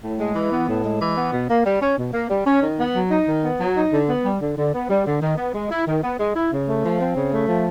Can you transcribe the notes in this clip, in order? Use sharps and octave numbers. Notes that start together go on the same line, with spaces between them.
A2
G#3
E3
B3
A2
G#3
E3
B3
B2
A#3
G3
C#4
B2
A#3
G3
C#4
D#3
B3
F#3
D#4
D#3
B3
F#3
D#4
D3
B3
G3
D3
D3
B3
G3
D3
D#3
B3
G#3
E4
D#3
B3
G#3
E4
C#3
A3
F3
C4
C#3
A3
F3